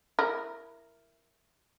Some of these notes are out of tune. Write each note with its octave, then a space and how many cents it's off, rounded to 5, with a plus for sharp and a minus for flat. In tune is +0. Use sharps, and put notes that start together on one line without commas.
E4 +10 A#4 +0